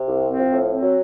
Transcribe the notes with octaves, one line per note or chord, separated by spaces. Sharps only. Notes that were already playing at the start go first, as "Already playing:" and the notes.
Already playing: C3
C2
C4
F3
A2
C4
F#3